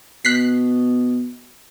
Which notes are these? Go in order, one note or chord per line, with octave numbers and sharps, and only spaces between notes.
B2 F#6 B6 C7